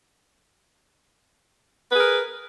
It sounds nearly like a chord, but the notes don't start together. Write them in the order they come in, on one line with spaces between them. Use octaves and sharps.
B4 G#4 A#4